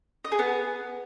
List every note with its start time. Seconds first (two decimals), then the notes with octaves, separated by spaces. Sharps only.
0.25 D#5
0.32 G#4
0.39 B3